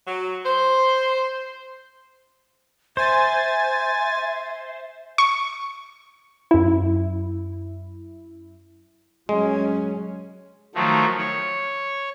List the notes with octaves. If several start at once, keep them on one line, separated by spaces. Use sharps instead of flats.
F#3
C5
C5 E5 G#5 A6
C#6
F#2 E4
F#3 G#3 C#4
D#3 F3 F#3 A3
C#5